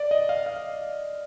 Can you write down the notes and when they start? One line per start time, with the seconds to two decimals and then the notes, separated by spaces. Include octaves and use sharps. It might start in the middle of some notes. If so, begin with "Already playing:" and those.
Already playing: D5
0.11 D#5
0.29 F5
0.46 F5